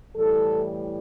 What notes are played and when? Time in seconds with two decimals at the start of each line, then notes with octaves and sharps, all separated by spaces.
0.15 A2 E3 G3 A4